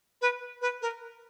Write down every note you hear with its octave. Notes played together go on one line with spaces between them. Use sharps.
B4
B4
A#4